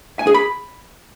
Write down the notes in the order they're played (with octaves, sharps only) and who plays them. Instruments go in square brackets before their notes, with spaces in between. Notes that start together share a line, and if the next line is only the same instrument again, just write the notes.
[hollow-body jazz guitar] G#5
G#4
B5